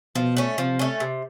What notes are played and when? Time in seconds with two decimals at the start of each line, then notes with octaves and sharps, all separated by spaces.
0.15 B2 F3
0.37 A3 C#4
0.58 C3 F3
0.79 A3 C#4
1.00 C3